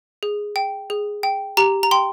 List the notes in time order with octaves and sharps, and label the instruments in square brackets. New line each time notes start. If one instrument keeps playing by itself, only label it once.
[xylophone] G#4
G5
G#4
G5
G4 A#5
A#5
G5 C6